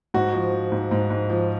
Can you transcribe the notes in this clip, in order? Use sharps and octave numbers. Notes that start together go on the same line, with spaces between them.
G#2 F#4
F3
F3
G#2
G#2
G#2
F3